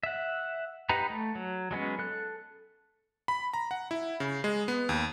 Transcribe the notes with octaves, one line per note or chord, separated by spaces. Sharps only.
E5 F#5
D#4 G4 B4 F#5 A#5
A3
F#3
F#3 G#3 B3 C#4
A4 F#6
B5
A#5
F#5
E4
C#3
G#3
B3
D#2